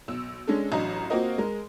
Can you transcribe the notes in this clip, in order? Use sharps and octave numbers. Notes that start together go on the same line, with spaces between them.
B1 E6
G#3 C#4 D4 A4
A1 F#3 D4 D#5 A#5
A#3 C4 F4 F#4 A#4 D#5
G#3 A#4